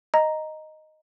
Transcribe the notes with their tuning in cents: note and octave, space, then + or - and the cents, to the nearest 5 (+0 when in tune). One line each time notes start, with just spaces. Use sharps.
D#5 +0 A#5 +0